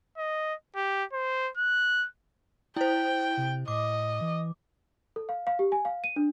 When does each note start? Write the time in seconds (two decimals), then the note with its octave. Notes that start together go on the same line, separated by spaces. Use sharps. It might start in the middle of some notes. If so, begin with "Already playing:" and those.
0.17 D#5
0.76 G4
1.13 C5
1.57 F#6
2.76 E4 C5 G5
3.37 C3
3.68 A2 D#5 D6
4.21 E3
5.16 A4
5.29 F5
5.47 F5
5.59 G4
5.72 G#5
5.85 F5
6.04 D#7
6.16 D4